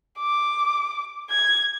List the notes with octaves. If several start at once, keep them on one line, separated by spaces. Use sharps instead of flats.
D6
G#6